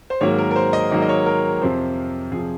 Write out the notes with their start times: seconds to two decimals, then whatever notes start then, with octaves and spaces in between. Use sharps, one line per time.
0.10 C5
0.21 G#2 D#3 F#3 A#3 C#5
0.38 A#4
0.51 A#4
0.56 C5
0.73 D#5
0.91 G#2 D#3 F#3 A#3 D#5
1.02 D#5
1.09 C#5
1.26 A#4
1.62 F2 C3 F3 C5
2.32 F2 C3 F3 G#4